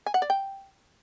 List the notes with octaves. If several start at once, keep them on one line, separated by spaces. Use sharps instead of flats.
G#5
F#5
D5
G5